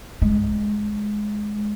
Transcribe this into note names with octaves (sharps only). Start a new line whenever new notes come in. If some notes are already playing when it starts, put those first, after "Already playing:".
G#3